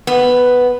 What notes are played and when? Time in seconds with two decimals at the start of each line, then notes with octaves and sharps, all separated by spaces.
0.07 B3